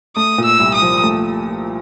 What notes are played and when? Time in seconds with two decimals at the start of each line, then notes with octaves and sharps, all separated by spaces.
0.16 A3 D#6
0.38 A#2
0.45 E6
0.60 C2
0.75 D#6
0.82 F3
1.03 A3